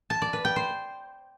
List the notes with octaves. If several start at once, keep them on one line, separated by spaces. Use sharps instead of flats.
A5
D5
B4
G5
C5